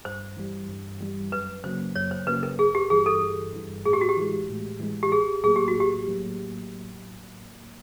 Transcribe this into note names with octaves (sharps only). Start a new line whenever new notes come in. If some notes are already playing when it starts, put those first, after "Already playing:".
G2 C5
E3 G3
G2
E3 G3
F#2 B4
C#3 F#3 A#3 C5
F#2 C#5
C5
C#3 F#3 A#3 B4
A#4
G1 G#4
G4
G2 E3 G#4
A4
G1
G2 E3
A2 G#4
G4
F#4
G4
E3 G#3
A2
E3 G#3
G4
A1 G#4
A2 F#3 A#3 G#4
G4
F#4
A1 G4
A2 F#3 A#3